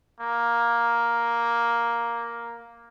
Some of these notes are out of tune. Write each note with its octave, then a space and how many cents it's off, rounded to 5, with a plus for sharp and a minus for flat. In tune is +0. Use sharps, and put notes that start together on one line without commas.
A#3 +5